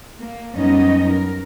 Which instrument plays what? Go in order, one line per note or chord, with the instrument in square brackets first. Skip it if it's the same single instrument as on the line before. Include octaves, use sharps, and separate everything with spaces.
[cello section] A#3
F#2 G3 B3 C#4 D#4 D#5
A#4